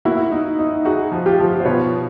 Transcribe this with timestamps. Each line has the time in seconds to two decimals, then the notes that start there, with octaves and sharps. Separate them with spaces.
0.05 A#3 E4 F#4
0.31 D#4
0.59 D#4
0.85 D#4 F#4 G#4
1.12 F3
1.26 F4 G4
1.39 F3
1.60 C5
1.65 B2 B4 C#5